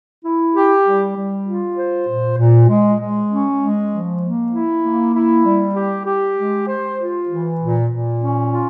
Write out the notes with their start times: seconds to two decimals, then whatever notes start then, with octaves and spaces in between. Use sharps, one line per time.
0.23 E4
0.54 G4
0.84 G3
1.15 G3
1.46 F4
1.76 C5
2.07 A#2
2.38 A#2
2.69 G#3
2.99 G#3
3.30 C#4
3.60 G#3
3.91 F3
4.22 A#3
4.52 E4
4.83 A#3
5.14 E4
5.45 G3
5.75 G4
6.06 G4
6.36 G#3
6.68 C5
6.98 F4
7.28 E3
7.59 A#2
7.90 A#2
8.21 C#4
8.51 F4